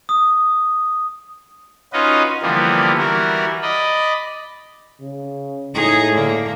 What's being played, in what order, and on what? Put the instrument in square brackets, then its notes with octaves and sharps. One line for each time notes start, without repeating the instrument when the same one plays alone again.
[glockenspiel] D#6
[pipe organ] C#4 D#4 F4 F#4 B4 D#5
D3 E3 F3 G3 A#3 B3
E3 G3 F#4 A#4
D5 D#5 B5
[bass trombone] C#3
[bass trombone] A2 [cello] D#4 G#4
[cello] D3 A#3